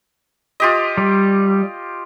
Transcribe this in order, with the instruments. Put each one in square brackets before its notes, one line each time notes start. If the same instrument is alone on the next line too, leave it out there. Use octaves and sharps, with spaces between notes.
[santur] F4 G4 D#5
[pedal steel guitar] G3